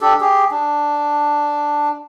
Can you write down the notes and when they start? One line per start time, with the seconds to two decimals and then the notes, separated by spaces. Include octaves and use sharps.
0.01 D4 G4 A4
0.21 G4 G#4
0.51 D4